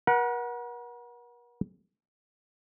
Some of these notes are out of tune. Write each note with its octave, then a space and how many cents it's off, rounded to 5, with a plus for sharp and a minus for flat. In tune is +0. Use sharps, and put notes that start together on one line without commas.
A#4 +45 F#5 +0